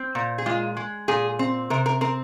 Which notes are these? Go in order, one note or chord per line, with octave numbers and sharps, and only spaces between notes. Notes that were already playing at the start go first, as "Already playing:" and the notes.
Already playing: C4
A#2
G#4
G#3 F4
G#3
A#2 G#4
C4
C3 A#4
A#4
C4 A#4